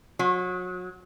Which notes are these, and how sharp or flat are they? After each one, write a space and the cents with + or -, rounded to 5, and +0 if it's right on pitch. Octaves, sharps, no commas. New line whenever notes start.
F#3 -30